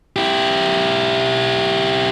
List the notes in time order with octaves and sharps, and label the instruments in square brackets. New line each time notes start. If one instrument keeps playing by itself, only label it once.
[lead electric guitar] E4 G4